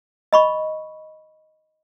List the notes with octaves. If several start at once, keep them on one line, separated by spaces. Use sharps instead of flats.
D#5 B5 C#6